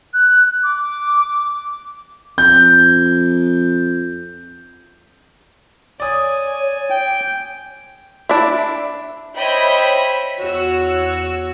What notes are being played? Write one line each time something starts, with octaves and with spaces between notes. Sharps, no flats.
F#6
D6
F2 G6
C#5 D5 G#5 D#6
G5
D4 E4 E5
C5 C#5 D#5 E5 G5 B5
E2 F#4 C#5 E6